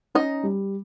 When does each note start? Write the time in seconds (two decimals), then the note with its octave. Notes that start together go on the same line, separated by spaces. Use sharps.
0.15 C#4 D#4 D#5
0.43 G3